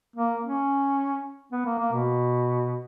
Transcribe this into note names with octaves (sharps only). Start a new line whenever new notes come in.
A#3
C#4
B3
A#3
A#3
B2